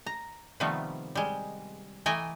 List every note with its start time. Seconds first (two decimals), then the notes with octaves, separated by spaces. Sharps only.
0.06 A#5
0.60 C3 D#3 F3 G3 A3 B3
1.15 G3 G#3
2.06 E3 A3 D#5 G5 G#5 A#5